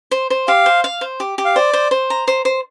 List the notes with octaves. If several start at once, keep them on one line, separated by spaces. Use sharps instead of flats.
C5
C5
G4 F5
C5
F5
C5
G4
G4
F5
C5 D5
C5
C5
A#5
C5
C5